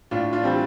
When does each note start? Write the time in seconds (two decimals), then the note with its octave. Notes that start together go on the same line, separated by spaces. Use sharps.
0.11 A2 D4 F4
0.33 D4 F4
0.43 E3 G3 C4